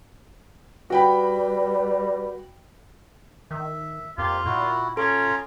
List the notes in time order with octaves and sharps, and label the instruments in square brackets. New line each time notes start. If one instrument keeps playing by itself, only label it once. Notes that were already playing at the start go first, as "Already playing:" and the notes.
[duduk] G3 [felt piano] F#4 G5 B5 [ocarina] B4
[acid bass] D#3 [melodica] E5
[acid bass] F2 [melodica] A#3 G4 [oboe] F4
[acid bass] A#2 [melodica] E4 F#4
[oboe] C#4 [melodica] F4 A#5 C6 [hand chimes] A4